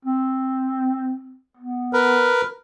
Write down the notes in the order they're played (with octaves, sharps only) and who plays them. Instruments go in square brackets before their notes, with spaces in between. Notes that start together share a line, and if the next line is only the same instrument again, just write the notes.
[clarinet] C4
B3
[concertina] A#4 B4